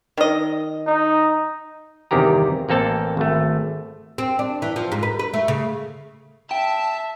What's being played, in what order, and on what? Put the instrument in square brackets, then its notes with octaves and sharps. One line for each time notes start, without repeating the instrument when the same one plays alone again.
[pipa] D#3 D#5
[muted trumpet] D#4
[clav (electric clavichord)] G1 E2 C3 D#3 G4 A#5
A1 A#3 C4 A4 A5
G#1 A3
[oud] C4
D4
E3
F3
G#2
B4
B4
A3
C#3
[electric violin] E5 [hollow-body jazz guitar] G5 [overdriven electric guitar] A5